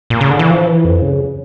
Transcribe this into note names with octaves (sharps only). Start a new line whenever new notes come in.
A#2
C#3
D3
E3
F3
E3
F2
C#3